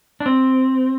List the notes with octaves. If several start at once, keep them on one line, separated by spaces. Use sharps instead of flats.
D4
C4